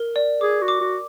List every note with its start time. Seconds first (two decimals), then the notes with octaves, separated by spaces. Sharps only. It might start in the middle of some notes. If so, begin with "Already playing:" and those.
Already playing: A#4
0.16 D5
0.41 G#4 D6
0.62 F#4
0.68 D6
0.81 F#4